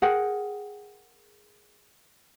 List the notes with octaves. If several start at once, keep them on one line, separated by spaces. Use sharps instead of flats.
G#4 A#4 F#5 G5